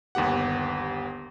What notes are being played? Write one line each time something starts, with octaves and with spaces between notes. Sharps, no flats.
G1 D#2 B3 G4 F#5